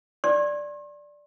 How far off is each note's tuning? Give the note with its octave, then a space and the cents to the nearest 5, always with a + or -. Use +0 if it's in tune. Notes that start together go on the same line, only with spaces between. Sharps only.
D5 +0 C6 +45